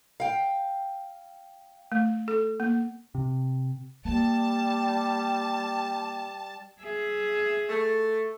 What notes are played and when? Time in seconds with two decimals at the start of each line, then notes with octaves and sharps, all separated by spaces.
0.20 F5 G5
1.92 A3
2.28 A4
2.60 A#3
3.15 C3
4.05 G3 A#3 A5
6.82 G#4 E5
7.69 A3